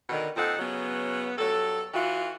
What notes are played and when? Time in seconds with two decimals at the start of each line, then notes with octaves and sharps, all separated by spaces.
0.09 B2 D3 D#3
0.37 A#2 C4 D#4 A4 F#5
0.59 C#3 F#3 B3
1.37 G2 F#3 A4
1.94 E3 F4 F#4